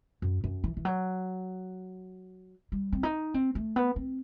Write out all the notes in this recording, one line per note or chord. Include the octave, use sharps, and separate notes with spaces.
F#2
F#2
E3
E3
F#3
G3
C4
D#4
C4
A3
B3
C4